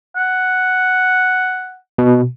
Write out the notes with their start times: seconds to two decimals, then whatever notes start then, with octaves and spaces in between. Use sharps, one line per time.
0.17 F#5
1.98 B2